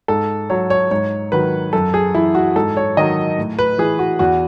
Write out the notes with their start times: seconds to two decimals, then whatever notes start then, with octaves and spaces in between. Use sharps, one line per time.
0.08 G#2 A4
0.50 F#3 C#5
0.70 C#5
0.91 G#2 C#5
1.32 D#3 F#3 B4
1.73 F#2 A4
1.94 G#4
2.15 E3 E4
2.35 F#4
2.56 G#2 A4
2.77 C#5
2.97 D#3 F#3 D#5
3.38 A2
3.59 B4
3.78 E3 G#4
3.99 F#4
4.19 E2 F#4